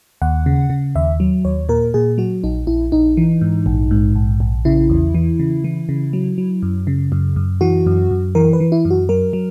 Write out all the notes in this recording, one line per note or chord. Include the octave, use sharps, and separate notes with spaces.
D#2 F#5
C#3
C#3
D#2 E5
F#3
D#2 C#5
A#2 A#4
A#2 G#4
F#3 F#4
A#1 D#4
A#1 E4
A#1 D#4
E3
G#2
A#1
G#2
A#1
A#1
C#3 E4
E2
E3
C#3
E3
C#3
F#3
F#3
F#2
C#3
F#2
F#2
E3 F#4
F#2
F#2
E3 A#4
B4
E3
E4
F#2
F#4
F#3 A#4
F#3